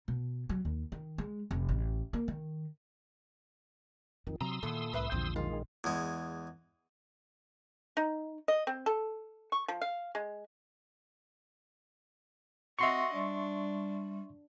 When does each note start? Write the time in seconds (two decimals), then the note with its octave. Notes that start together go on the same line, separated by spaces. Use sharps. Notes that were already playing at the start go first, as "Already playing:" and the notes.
0.08 B2
0.49 F#3
0.65 D#2
0.92 D#3
1.18 G#3
1.51 F1
1.69 A1
2.13 A#3
2.28 D#3
4.27 F2 D#3 F4
4.41 C3 F#3 A#5 C6 D#6 E6
4.63 E2 A#2 D#3 A4
4.93 C2 A2 A#4 B4 E5
5.12 A#1 E2 D3 F3 C4
5.36 D#3 G#3 F4
5.84 E2 G#3
7.97 D#4
8.48 D#5
8.67 C4
8.86 A4
9.52 C#6
9.68 F3
9.81 F5
10.15 G#3
12.79 C4 F#4 D#5 E5 C6 C#6
13.14 G3 D4